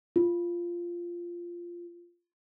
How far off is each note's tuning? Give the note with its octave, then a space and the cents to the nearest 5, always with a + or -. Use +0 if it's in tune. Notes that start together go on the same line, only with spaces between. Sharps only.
F4 -10